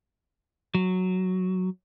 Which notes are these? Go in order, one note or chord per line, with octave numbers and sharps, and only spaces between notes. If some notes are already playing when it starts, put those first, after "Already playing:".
F#3